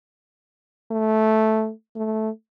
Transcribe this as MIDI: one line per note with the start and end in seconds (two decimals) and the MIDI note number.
0.92 1.71 57
1.96 2.30 57